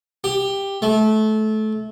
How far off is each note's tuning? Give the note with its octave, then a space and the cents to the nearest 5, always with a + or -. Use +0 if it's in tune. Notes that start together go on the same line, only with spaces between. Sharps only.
G4 +10
A3 -25